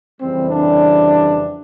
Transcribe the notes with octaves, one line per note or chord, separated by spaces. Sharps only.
F2 C#3 E3 G3 C4
D4